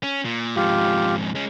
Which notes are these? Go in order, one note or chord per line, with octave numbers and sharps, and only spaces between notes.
C#4
A#2
F2 G#2 F4 G4
G#3 C#4